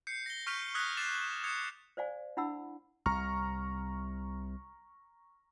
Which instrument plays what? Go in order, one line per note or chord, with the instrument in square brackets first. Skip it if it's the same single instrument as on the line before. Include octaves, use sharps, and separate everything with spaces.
[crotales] G6 C7 C#7
A#6 G7
C#6 F6 G6 B6 D#7 F7
D#6 E6 F#6 G#6 A#6 B6
D6 A6 C7 E7 F7
D#6 G#6 C#7 F7
[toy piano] C5 D5 F5 G#5
D4 E4 F#5 B5 E6
[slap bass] C2 C3 [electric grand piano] A#5 C#6 F6